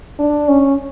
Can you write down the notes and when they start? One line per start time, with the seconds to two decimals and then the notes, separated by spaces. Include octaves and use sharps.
0.19 D4
0.48 C#4